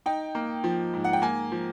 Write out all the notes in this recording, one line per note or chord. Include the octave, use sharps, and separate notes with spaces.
D#4 G5
A#3
F3
G#2
F#5
G5
A#3 G#5
F3